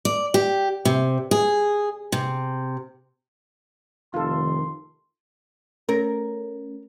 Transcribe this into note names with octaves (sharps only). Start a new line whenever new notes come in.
D5
G4
C3
G#4
C3
F1 D#3 F4 A4 C6
A3 C#4 A#4